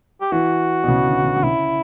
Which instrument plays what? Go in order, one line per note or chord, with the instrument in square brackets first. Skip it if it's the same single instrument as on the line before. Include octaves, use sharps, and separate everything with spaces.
[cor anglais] G4
[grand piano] E3 [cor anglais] F#4
[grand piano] B2
C#3
D3
D3
D3
[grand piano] C#3 [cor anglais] E4